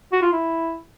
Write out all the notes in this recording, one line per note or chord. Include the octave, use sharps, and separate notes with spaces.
F#4
F4
E4